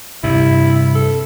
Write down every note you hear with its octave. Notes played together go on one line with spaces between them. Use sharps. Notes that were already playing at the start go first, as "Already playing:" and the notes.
G2 C3 E4
A4